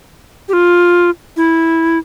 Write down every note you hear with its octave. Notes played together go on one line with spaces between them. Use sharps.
G4
F4
E4